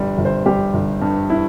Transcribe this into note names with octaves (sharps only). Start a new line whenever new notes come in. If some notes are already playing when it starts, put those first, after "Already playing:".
Already playing: G1 G3
G1
C5
G3 G4
G1
G2
E4